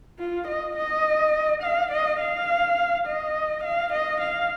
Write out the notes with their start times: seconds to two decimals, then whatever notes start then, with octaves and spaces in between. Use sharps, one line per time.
0.19 F4
0.48 D#5
0.76 D#5
1.62 F5
1.92 D#5
2.20 F5
3.06 D#5
3.64 F5
3.93 D#5
4.21 F5